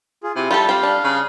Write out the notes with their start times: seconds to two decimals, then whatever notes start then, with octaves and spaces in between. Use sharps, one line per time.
0.23 F4 G#4
0.36 C3 E4
0.51 G3 F4 G4 A4
0.69 C4 C5 F5 G5
0.83 D4
1.04 C#3